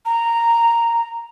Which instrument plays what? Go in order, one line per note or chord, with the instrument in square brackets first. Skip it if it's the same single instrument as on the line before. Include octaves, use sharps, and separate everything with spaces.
[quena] A#5